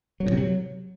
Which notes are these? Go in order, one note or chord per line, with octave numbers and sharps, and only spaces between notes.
F#3
A2
C3
F#3